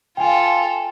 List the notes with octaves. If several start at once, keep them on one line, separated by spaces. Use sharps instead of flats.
F4 A4 G5 G#5